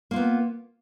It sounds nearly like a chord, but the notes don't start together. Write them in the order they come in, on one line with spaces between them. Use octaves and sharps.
A#3 F4 B3